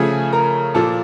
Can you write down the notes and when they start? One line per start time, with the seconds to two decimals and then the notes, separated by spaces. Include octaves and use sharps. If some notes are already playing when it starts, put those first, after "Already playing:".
Already playing: C#3 F3 A3 G#4 G#5
0.32 A#4 A#5
0.74 A#2 F3 A#3 A4 A5